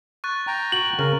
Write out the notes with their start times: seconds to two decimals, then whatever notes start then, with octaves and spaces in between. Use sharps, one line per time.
0.24 C#6 F#6 A6
0.47 G5 A#5
0.72 F#4 F#7
0.99 C#3 A#4